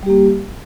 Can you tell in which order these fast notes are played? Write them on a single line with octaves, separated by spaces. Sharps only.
G3 G4 A#3